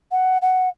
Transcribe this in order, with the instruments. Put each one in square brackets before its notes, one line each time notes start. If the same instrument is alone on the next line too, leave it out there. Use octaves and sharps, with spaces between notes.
[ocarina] F#5
F#5